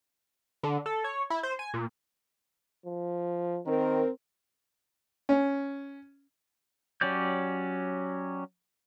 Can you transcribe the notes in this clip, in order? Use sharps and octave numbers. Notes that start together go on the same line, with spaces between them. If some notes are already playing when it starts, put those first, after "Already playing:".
D3
A4
C#5
E4
C5
G#5
A#2
F3
D#3 C4 A#4
C#4
F#3 C#4 G4 D5 G6